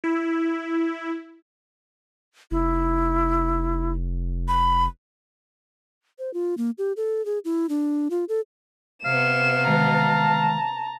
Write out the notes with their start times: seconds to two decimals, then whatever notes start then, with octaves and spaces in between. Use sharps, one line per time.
0.04 E4
2.51 F1 E4
4.48 B5
6.19 C5
6.34 F4
6.57 A#3
6.78 G4
6.97 A4
7.26 G#4
7.45 E4
7.69 D4
8.10 F4
8.29 A4
9.05 C3 B3 F5 E7
9.68 D#3 G#3 A5 A#5